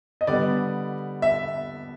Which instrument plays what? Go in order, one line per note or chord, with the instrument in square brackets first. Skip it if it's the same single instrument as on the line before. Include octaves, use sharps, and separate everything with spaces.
[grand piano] D#5
D3 G3 B3 D5
E5